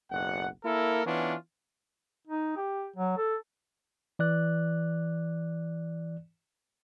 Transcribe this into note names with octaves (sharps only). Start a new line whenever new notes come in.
F#1 B1 F#5
A#3 E4 A4 A#4
E3 B3 C#4 D4 F4
D#4
G4
F#3
A4
E3 D5 F#6